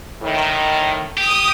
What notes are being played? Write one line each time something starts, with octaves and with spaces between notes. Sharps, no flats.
A2 D#3
G4 D#6